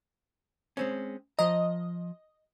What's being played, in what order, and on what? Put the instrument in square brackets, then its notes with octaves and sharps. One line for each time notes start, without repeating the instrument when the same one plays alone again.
[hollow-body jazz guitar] G#3 C4 C#4
[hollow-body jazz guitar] F3 A#5 [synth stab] D#5